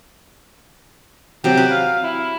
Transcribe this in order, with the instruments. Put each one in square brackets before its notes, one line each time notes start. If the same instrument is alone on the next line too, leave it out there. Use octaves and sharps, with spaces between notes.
[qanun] C3 F#3 [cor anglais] G5
[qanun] B4
[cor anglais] F5
E4